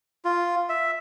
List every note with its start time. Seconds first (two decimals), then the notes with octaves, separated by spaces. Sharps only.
0.25 F4
0.69 E5